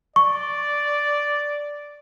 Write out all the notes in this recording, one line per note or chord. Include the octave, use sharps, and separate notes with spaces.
D5 C#6